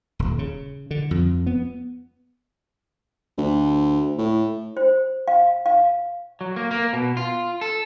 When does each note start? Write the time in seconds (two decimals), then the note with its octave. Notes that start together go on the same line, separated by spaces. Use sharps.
0.19 D#1
0.39 C#3
0.91 D3
1.11 F2
1.47 B3
3.38 D2
4.18 A2
4.77 C5
5.28 F5
5.66 F5
6.41 F#3
6.56 A#3
6.71 A#3
6.93 B2
7.17 F4
7.61 A4